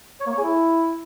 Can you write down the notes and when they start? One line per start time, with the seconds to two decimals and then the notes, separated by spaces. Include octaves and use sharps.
0.20 C#5
0.26 A#3
0.32 C#5
0.38 G#4
0.43 E4